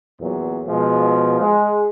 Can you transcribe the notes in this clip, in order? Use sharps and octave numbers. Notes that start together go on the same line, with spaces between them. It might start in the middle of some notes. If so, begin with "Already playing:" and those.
E2 A#2 F#3
B2 F3 G#3
G#3